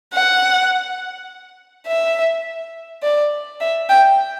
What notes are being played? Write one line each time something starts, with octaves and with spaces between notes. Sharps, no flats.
F#5
E5
D5
E5
G5